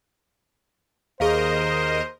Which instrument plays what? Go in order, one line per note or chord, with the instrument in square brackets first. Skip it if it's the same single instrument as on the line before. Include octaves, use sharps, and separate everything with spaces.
[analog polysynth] D#2 A#4 D#5 [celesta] G#4 F5 [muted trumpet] C5